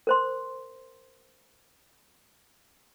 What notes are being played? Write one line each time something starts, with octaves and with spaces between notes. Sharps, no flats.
A#4 C5 C6